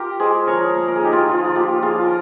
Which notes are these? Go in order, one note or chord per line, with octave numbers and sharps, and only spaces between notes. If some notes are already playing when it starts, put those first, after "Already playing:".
Already playing: F4 G4 A#4
G#3 G#4 C5
F3 A#4 C#5
A#3
A#4
G#4
D#4 G4
F4 G#4
F3 F4
F4
A#3 G4
F3 F4 G#4
A#4